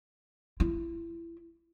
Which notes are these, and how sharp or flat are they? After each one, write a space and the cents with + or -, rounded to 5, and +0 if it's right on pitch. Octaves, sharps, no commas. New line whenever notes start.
E4 +25